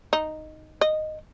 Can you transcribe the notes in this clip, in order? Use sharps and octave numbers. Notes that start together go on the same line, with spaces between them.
D#4
D#5